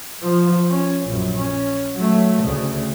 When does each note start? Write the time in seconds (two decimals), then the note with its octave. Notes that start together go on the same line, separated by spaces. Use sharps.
0.22 F3
0.70 C#4
1.06 A#1 F#2
1.36 C#4
1.95 F#3 A3
2.41 D2 C#3